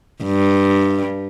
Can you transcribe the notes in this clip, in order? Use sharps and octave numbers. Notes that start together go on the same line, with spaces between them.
G2